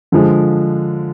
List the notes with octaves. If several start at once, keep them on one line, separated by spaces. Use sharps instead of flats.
D3 F3 G#3